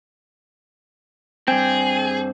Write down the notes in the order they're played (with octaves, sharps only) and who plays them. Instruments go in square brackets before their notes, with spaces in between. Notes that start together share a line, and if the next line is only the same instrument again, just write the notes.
[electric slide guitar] G2 C4 [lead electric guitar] G#4 [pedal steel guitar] G5